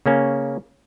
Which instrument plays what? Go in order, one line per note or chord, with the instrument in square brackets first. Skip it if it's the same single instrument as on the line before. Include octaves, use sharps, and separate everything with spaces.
[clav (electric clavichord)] C#3 A#3 C#4